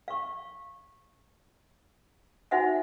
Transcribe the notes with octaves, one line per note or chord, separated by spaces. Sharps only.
F5 C#6
D#4 F#4 C5 E5 F#5 G#5